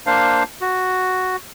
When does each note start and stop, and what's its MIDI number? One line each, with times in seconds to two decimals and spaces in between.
0.06 0.43 58
0.06 0.43 62
0.06 0.43 72
0.06 0.43 77
0.61 1.36 66